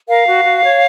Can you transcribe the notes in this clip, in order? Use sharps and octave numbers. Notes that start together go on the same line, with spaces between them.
A#4 F5
F#4
F#4
C#5